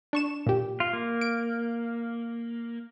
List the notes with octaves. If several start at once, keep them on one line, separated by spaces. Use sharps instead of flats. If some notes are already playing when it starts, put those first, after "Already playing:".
D4 C#6 E7
A#2 G4
F4
A#3
D7